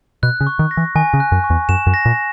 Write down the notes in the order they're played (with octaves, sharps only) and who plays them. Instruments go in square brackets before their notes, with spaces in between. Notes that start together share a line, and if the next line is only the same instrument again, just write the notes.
[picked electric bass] B2 [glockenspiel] F#6
[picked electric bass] C#3
[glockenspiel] C#6
[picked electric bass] D#3
[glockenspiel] A#6
[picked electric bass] E3
[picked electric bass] D#3 [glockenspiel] G#5
[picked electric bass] C#3
[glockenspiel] F#6
[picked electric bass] F#2
[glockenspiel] C#6
[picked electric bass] E2
[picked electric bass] F#2 [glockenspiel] E7
[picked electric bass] F#2
[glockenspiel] A#6
[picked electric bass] A#2